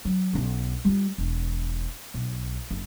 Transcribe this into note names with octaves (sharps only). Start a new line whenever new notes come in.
F#3
B1 C#4
G3 F4
E1
B1
F#1